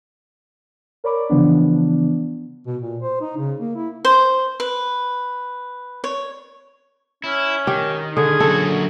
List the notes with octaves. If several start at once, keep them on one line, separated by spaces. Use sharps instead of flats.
A#4 C#5 D5 B5 D6
C#3 E3 F3 B3 D4
B2
A#2
C5
D#4
C#3
A#3
E4
C5
B4
C#5
C#4 E4
D#3 G4
D3 G#4
F#2 A#2 F#4 A4